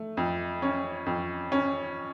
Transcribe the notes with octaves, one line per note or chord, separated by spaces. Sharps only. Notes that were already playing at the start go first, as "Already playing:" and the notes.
Already playing: A3
F2
C#4
F2
C#4